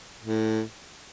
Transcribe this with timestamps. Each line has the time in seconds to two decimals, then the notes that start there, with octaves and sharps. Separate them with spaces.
0.24 A2